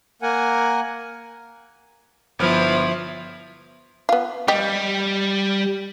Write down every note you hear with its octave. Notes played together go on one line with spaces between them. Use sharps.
A#3 A#4 F#5 G#5
G1 F3 B3 E4 F4 F6
B3 F4
G3 G4 D#5